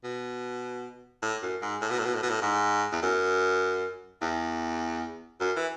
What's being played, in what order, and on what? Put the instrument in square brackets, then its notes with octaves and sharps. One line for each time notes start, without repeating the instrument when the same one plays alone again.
[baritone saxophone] B2
A2
F#2
G#2
A2
B2
A2
B2
A2
B2
A2
G#2
E2
F#2
E2
F#2
E3